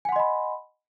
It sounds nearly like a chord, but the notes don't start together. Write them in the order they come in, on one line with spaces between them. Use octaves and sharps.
G#5 F#5 C6 D#5 B5